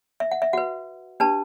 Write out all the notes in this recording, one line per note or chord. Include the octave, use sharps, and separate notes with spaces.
E5
F#5
E5
F#4 B4 F#5
D4 G4 B4 A5